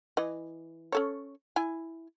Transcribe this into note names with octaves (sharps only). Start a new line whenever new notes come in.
E3 D#5
C#4 A4 C#5
E4 G#5